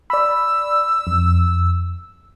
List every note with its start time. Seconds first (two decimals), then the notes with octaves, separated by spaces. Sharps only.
0.10 D5 B5 E6
1.07 F2